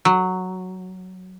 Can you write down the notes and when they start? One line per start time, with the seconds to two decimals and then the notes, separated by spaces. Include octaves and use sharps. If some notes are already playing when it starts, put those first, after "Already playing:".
0.05 F#3